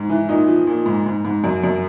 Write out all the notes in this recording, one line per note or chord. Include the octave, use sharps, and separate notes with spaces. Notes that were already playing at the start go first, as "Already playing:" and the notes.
Already playing: G#2
E3
A#2 D#4
F3
A#2
G#2
G#2
G#2
F#2
F#2